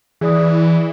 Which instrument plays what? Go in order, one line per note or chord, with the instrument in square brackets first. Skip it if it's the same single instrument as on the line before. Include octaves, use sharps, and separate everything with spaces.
[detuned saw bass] E3 [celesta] G#4 D5 D#6